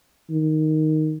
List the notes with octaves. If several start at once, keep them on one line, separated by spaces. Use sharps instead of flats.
D#3